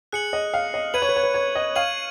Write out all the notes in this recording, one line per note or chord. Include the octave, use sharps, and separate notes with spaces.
G#4 F#6 C#7 F#7
D#5
F5
D#5
B4 G#6 D#7 F#7
C#5
B4
C#5
B4
C#5
D#5
F5 C#6 G#6 D#7 F#7